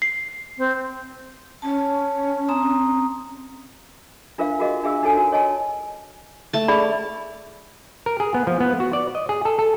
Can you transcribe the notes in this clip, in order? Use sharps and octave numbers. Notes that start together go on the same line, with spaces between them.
C7
C4
C#4 A5
C4 A#5 D#6
D4 F4 A#4 C5 E5 F5
F4 F#4 G#4 A#4 D#5 F5
D4 F4 G#4 E5 F5 E6
D4 D#4 F#4 A4 C#5 G#5
D#4 F#4 A#4
C#5 D#5 G#5 A5
A3 A5
G#4 D5 B5
A#4
G#4
B3
F3
B3
F#4
D5
D#5
G#4
A4
A4